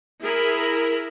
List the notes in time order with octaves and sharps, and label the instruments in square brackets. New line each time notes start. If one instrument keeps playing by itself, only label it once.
[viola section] E4 G#4 A#4 B5